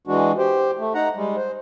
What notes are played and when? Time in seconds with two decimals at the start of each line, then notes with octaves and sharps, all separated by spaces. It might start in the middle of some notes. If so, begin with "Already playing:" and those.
0.07 E3 G#3 D4 F#4
0.38 G4 C5
0.79 A3
0.94 D#4 F#5 A#5
1.16 G3 G#3
1.36 C5